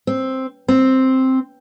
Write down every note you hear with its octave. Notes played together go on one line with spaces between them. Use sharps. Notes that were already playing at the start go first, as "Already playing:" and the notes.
C4
C4